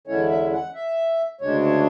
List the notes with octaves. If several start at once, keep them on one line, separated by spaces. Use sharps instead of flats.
E2 D3 G#3 C#4 E4 C#5
E5
F#5
E5
D2 C#3 G#3 D4 C#5
C#5